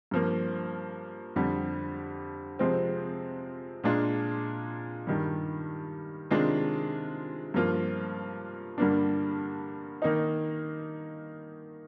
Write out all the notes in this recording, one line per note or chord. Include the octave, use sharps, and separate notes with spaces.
G2 F3 A#3
F2 D3 G3
C3 F3 G#3 C4 F4
A#2 G#3 D4 F4
G2 D#3 G3
C3 D#3 G#3 D4 F4
G2 F3 A#3 F4
G2 D3 G3 A#3 D4
D#3 A#3 D#4